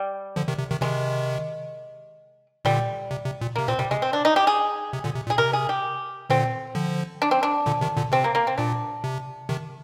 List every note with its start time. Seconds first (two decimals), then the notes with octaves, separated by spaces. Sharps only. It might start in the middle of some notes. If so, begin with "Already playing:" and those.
Already playing: G3
0.36 D3 F3
0.48 C3 D#3
0.59 C3
0.71 C3 D#3
0.82 C3 D#3 G#3
2.65 A#2 D3 G3
3.11 C3
3.25 C3
3.41 A#2
3.56 C3 A#3
3.68 A#2 C4
3.78 C3 G3
3.91 C3 G#3
4.02 C4
4.13 D4
4.25 D#4
4.36 G4
4.47 G#4
4.93 C3
5.04 A#2 D3
5.15 C3
5.27 A#2
5.30 G#4
5.38 C3 A#4
5.53 G#4
5.69 G4
6.30 A#2 D3 C4
6.75 D3 F3
7.22 D4
7.31 C4
7.43 D4
7.66 A#2 D3
7.81 C3 D#3
7.97 A#2 D3
8.12 C3 C4
8.24 A#3
8.35 A#3
8.47 C4
8.58 A#2 D4
9.04 C3
9.49 C3 D#3